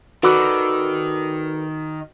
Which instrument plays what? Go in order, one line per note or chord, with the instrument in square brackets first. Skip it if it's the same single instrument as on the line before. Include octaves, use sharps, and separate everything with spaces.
[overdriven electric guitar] D#3 [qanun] F#4 [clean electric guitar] A4 B4 D5